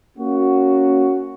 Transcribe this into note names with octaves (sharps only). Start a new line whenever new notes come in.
A#3 C#4 F#4